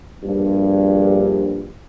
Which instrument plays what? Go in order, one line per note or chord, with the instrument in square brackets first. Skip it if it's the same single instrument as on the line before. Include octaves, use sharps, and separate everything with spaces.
[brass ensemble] A#1 G2